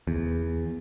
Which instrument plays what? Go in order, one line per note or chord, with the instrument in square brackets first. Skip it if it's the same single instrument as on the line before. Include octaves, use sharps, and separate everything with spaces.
[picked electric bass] E2